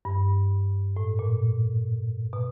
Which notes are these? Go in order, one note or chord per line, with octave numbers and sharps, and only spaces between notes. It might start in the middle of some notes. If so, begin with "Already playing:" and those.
G2
A2
A#2
B2